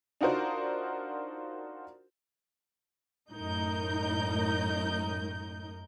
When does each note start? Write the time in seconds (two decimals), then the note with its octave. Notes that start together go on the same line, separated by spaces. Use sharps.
0.21 D4 D#4 F4 F#4 A#4 C5
3.33 F#2 A2 D#4 A#4 G6